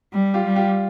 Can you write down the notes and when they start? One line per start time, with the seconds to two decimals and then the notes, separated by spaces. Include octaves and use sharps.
0.13 G3
0.34 F4 G4
0.45 G3
0.56 F4 G4